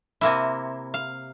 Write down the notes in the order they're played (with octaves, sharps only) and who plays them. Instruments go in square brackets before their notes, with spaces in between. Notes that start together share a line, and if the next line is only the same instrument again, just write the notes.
[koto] C3 A#3 E4
F5